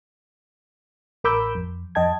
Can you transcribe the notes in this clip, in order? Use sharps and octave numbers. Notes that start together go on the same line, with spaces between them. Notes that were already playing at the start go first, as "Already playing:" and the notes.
A1 A#4 B5 D6 E6 G6
F2
F2 D#5 G5 A5 G#6